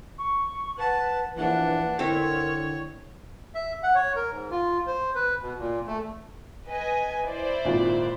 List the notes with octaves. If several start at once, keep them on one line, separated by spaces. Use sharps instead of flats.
C#6
B4 F#5 A5
A#1 E3 D4 B4 F#5
D3 C4 E4 A#4 C#5
E5
F#5
C#5
A#4
G#2
F4
C5
B4
B2
A#2
A3
B4 D#5 G#5
E4 C5 D5
G#1 A#2